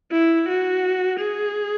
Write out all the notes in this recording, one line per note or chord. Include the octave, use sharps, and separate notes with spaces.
E4
F#4
G#4